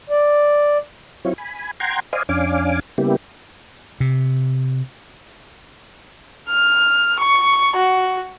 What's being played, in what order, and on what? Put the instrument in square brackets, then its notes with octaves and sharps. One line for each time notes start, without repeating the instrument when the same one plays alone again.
[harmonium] D5
[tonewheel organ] F#3 C4 E4 F4 C#5
G#5 B5
F#5 G5 A#5 C6 G#6
C5 D5 D#5 F5 G#5
F2 C#4 D4 F5 G#5 D6
C#3 G3 A#3 B3 E4 G4
[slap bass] C3
[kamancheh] F6
C#6
F#4